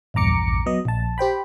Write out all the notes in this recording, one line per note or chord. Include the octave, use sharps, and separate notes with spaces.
A#1 E2 G2 A#5 D6 C#7
F#3 B3 D#5
A#1 A5
G4 C5 G5 B5